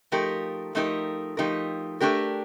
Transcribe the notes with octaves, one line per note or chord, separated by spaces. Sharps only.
F3 A3 D#4 G4 A#4
F3 A3 D#4 G4 A#4
F3 A3 D#4 G4 A#4
A3 D4 G4 A#4